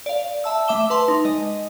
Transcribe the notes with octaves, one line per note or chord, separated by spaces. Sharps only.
D5 F5
E5 A5 E6
A3 E5 D6 E7 G7
B4 A5 C6
D#4
G#3 D#5